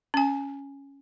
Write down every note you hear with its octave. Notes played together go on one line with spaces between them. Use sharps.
C#4 G#5